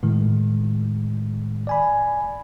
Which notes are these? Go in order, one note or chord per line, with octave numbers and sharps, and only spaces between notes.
A2 D#3 G#3
D5 G#5 B5